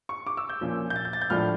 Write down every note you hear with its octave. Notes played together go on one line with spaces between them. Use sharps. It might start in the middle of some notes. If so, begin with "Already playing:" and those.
C#6
D6
E6
G6
A#2 F3 C#4
G6
A6
G6
A6
G6
A2 F3 A3 D4 F6